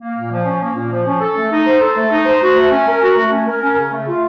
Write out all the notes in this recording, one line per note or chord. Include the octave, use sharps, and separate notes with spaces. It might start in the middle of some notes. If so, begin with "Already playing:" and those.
A#3
A#2
F3
C#4
A#3
A#2
F3
C#4
A4
A3
D#4
C5
A4
A3
D#4
C5
F#4
A3
C#4
A#4
F#4
A3
C#4
A#4
C#4
C#3
A3
F4